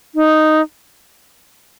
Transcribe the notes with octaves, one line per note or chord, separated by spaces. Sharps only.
D#4